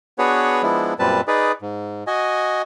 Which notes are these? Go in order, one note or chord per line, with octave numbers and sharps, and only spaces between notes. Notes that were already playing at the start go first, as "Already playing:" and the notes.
B3 D4 F#4 G#4 B4 C#5
F3 G#3 B3 D4 E4
F#2 A#2 G3 C4 B4 A5
D#4 G#4 B4 D5
G#2
F#4 D#5 G#5